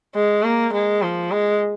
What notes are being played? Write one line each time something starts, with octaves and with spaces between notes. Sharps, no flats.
G#3
A#3
G#3
F3
G#3